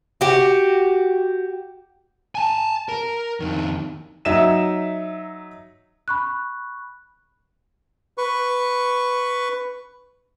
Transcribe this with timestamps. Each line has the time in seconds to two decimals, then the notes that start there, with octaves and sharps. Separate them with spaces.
0.21 F#4 G4
2.35 G#5 A5
2.89 A#4
3.40 F2 D#3
4.25 F#3 D#4 E5 E7
6.08 B5 C#6 F#6
8.18 B4 C#6